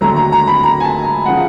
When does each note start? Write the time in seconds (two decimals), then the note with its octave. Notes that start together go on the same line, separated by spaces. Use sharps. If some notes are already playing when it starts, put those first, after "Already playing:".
0.01 D#2 D3 F#3 A3 A#5
0.16 A#5
0.32 A#5
0.48 B5
0.63 A#5
0.80 G#5
0.84 A5
1.05 A#5
1.26 C#3 F3 F#5